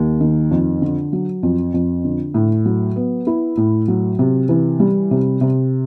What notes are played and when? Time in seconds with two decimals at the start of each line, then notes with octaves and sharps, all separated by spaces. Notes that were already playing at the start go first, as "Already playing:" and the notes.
Already playing: D#2
0.21 D#3
0.51 F2
0.82 D3
1.13 F#3
1.43 F2
1.74 F2
2.04 D3
2.34 A2
2.66 F#3
2.96 B3
3.27 E4
3.57 A2
3.88 F#3
4.19 C3
4.49 E3
4.80 G3
5.11 C3
5.41 C3